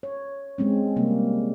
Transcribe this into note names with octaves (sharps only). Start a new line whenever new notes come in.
C#5
G#3 C4 C#4
C3 G3 A#3